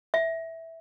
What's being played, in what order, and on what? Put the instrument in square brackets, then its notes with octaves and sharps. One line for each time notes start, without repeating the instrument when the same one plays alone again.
[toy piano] E5